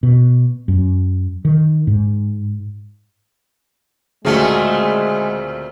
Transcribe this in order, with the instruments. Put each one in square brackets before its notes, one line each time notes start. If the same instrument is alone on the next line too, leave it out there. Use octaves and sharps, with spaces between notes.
[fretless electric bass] B2
F#2
D#3
G#2
[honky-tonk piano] D2 C#3 [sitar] A#2 A3 C4 [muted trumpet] G#3